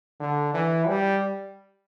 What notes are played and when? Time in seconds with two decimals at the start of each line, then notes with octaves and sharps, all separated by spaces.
0.20 D3
0.54 E3
0.87 G3